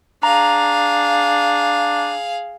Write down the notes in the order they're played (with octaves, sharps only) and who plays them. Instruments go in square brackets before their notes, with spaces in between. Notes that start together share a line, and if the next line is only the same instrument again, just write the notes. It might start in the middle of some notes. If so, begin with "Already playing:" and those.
[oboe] D4 [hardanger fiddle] G#4 F5 [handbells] A#5